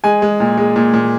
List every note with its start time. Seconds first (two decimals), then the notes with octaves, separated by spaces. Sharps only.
0.04 G#3 G#5
0.22 G#3
0.40 A#2
0.58 G#3
0.76 A#2
0.94 A#2